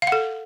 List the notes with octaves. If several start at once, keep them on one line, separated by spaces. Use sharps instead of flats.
F5
F#5
A4